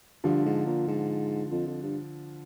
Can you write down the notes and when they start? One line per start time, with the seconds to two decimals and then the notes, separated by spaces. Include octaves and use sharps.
0.24 G2 D3 F3
0.45 G#2
0.66 A#2
0.88 G#2
1.51 F2
1.67 F2
1.83 G2